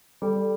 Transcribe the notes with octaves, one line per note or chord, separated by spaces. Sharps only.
G3 A4